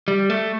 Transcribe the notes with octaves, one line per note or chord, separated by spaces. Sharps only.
G3
A3